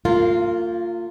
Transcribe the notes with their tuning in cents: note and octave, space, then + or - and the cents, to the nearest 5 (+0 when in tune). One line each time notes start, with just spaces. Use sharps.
A#3 -40 F4 +0